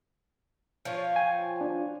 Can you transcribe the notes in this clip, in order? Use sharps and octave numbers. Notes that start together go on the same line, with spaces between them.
F3 F4 C#5
G5 G#5
D4